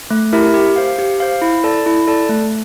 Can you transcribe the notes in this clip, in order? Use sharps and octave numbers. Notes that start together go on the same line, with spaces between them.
A3
E4 G4 A#4 E5
G4
C5 F5
G4
C5 F5
E4
A4 D5 A5
E4
A4 D5 A5
A3